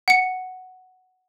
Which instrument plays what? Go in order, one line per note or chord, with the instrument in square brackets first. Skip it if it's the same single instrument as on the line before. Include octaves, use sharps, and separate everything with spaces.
[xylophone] F#5 C#7